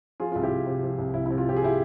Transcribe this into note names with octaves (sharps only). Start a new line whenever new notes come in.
F3 F4 G#4
C2 F4
E4 G4
C2
C3
F3
C2
C2 E4
E4
C3
F4
F3 G4
G#4
E4 G4